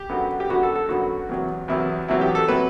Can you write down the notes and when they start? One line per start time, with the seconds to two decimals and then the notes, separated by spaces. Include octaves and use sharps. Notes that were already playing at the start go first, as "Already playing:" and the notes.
Already playing: G4
0.09 F#2 D3 F#3 B3
0.40 G4
0.49 F#2 D3 F#3 B3 F#4
0.63 A4
0.76 A4
0.89 F#2 D3 F#3 B3 F#4
1.29 E2 C3 F#3
1.68 E2 C3 F#3 E4
2.08 E2 C3 F#3 E4
2.21 G4
2.35 A4
2.48 C3 F#3 B4